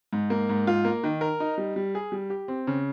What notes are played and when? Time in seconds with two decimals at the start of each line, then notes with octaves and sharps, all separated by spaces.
0.13 G#2
0.30 A#3
0.49 G#2
0.67 F4
0.85 A#3
1.04 D#3
1.21 A#4
1.40 D#4
1.58 G3
1.76 G3
1.95 G#4
2.12 G3
2.30 G4
2.48 C4
2.67 C#3